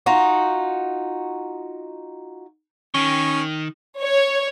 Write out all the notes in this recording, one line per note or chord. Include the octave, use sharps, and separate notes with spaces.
D#4 F4 F#4
D#3 C#4
C#5